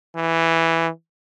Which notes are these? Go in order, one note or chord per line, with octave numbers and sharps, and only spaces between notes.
E3